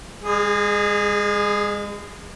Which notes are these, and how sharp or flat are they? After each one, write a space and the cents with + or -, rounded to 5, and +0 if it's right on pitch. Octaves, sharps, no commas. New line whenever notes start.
G#3 -35 G#4 +0